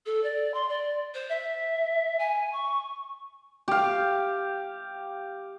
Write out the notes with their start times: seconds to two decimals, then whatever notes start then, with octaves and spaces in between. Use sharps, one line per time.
0.06 A4
0.23 D5
0.54 C6
0.68 D5
1.14 C5
1.29 E5
2.19 G#5
2.53 C#6
3.68 G4 F5